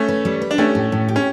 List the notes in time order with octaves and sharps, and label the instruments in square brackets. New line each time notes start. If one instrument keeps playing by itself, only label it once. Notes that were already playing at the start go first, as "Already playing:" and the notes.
Already playing: [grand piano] A3 C#4
[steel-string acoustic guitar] B4
G3
B4
[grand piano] D4
[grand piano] A3 C#4 [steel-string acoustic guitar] G4
[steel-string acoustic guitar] A2
A2
G4
[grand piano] C#4